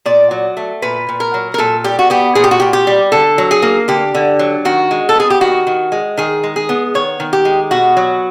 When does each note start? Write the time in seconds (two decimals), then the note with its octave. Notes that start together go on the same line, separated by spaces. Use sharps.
0.05 A#2 D5
0.31 F#3
0.57 A3
0.82 A#2 B4
1.09 A#2
1.20 A#4
1.34 F#3
1.54 A#4
1.58 A#2 A4
1.84 G3 G4
1.99 F#4
2.10 B3 G4
2.35 A#2 G#4
2.44 G4
2.51 F#4
2.60 A#2 G4
2.73 G4
2.87 G3
3.12 D3 A4
3.38 F#3
3.51 G#4
3.62 A#3
3.88 D3 G4
4.15 D3
4.39 F#3
4.65 D#3 F#4
4.91 G#3
5.09 A4
5.15 B3 G#4
5.30 G4
5.41 D#3 F#4
5.67 D#3
5.92 G#3
6.17 D#3 G#4
6.44 G#3
6.56 G#4
6.69 B3
6.94 D#3 C#5
7.20 D#3
7.33 G4
7.45 G#3
7.71 B2 F#4
7.97 F#3